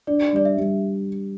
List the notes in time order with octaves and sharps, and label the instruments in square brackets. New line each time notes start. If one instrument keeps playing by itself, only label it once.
[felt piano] D4 [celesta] D5
[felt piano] G3 [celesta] D5
[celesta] E5
[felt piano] G3